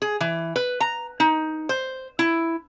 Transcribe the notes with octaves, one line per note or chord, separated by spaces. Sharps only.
G#4
E3
B4
A#5
D#4
C5
E4